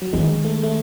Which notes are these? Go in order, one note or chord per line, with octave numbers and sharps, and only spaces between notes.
F#3
D#3 G#3
A3
A3